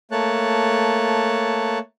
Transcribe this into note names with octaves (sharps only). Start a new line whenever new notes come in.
A3 A#3 C#5 A5 F#6